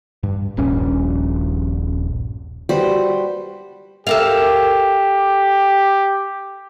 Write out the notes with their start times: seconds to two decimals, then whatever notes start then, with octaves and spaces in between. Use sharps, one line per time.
0.23 G2
0.57 D#1 A#1 G2 C#4
2.69 G3 F#4 B4 C5
4.07 G4 A4 A#4 F5